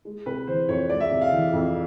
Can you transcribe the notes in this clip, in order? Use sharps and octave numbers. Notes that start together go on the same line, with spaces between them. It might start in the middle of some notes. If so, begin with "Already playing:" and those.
G#3
C3 B4
E3 C5
F2 C#5
G#3 D5
E5
C3
F5
E3
F2